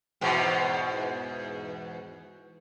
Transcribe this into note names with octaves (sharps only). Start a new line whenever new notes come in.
E2 G#2 B2